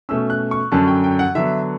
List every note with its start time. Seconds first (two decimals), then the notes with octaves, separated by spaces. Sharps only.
0.09 B2 A3 C#4 E6
0.30 F#6
0.51 C#6
0.72 F#2 D3 F#3 C#4 A5
0.87 G5
1.04 G5
1.19 F#5
1.35 D3 F#3 B3 E5